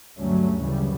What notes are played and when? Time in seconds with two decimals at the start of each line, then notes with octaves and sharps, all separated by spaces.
0.18 D2 G2 F#3 G3 A3 C#4
0.64 F#2 C#3 E3 G3